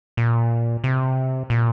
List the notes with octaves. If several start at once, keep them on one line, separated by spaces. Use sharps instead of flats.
A#2
C3
A#2